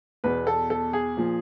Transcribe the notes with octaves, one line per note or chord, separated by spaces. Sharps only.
E2 B2 B4
A4
A4
G#4
A#2 F3